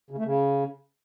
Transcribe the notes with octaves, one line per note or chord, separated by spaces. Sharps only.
C#3
A3
C#3